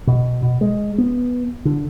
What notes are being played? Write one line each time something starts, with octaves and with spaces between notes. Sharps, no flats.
B2
B2
G#3
B3
D3